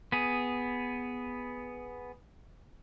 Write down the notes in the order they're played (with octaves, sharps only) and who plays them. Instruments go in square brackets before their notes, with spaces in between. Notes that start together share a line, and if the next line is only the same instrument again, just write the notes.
[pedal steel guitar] B3 G#4